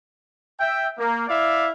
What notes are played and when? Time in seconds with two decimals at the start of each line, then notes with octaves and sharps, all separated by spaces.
0.60 E5 G5
0.99 A#3
1.28 E4 D5 E5 F5